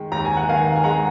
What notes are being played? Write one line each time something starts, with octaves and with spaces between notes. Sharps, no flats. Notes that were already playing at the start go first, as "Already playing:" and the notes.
Already playing: D#3 G#3
D#2 A#5
G#5
F#5
D#3 F5 G#5
G#5
G#3 F#5 A#5